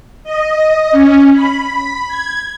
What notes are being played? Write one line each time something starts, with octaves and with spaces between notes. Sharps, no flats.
D#5
C#4
B5
G#6